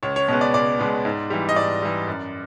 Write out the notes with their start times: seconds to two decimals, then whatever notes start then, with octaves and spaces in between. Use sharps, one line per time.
0.03 C#2 C#5
0.16 C#5
0.28 B2 G#3 B3 C#5
0.41 D5
0.54 C#2 D5
0.79 B2 G#3 B3
1.05 G#2
1.30 E3 G3
1.49 D#5
1.56 G#2 D5
1.82 E3 G3
2.07 F#2